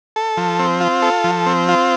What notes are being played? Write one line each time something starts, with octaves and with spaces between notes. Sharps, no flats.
A4
F3
C4
F4
A4
F3
C4
F4